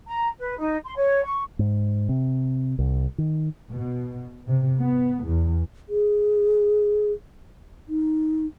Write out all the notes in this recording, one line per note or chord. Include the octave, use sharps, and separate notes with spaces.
A#5
B4
D#4
C6
C#5
C#6
G#2
C3
C2
D#3
B2
C3
B3
E2
G#4
D#4